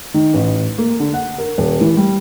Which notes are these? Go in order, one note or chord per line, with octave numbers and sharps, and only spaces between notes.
D#3
A1
A#3
D3
F#5
A#4
D#1
E3
G3